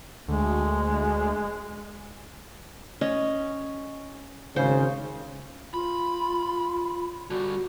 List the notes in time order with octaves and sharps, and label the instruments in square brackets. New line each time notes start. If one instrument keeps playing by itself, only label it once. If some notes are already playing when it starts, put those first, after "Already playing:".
[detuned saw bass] D2 [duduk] G#3
[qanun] C#4 D#5
[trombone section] G#1 C#3 [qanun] C5
[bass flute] F4 [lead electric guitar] B5
[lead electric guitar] D3 G3 [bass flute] F#4